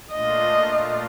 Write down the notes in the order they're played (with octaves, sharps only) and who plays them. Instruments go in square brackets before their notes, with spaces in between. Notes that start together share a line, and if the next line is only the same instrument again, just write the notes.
[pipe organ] A#2 A3 D4 F4 [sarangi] D#5